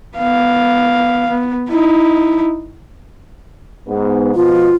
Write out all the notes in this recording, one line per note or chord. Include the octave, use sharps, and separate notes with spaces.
B3 F5
B3
D#4 E4
G#2 B3
B2 F3 F4